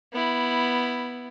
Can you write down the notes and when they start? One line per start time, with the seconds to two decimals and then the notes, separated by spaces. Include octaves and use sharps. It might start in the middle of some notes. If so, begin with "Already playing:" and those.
0.13 B3 E4